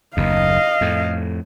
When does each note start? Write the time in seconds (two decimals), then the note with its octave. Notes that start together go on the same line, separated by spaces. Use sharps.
0.17 F#1 D#2 D#5 F5
0.81 F2 A2